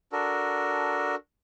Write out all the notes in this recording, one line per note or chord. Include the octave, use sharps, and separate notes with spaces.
D4 F#4 A4 A#4